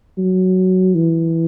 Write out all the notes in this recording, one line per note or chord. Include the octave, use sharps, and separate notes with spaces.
F#3
E3